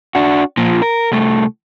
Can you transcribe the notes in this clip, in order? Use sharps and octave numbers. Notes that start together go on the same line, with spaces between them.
D4 F#4
A#2 F3
A#4
C2 A3